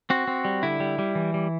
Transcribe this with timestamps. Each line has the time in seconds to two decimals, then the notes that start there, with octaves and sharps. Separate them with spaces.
0.10 C4 F#4
0.27 C4
0.45 G3
0.63 D3 E4
0.80 G3
0.99 G3
1.15 E3
1.34 G3